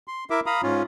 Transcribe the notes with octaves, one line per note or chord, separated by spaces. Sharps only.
C6
E4 A#4 E5 D6
F5 A#5 B5 D#6
G#2 C#4 F4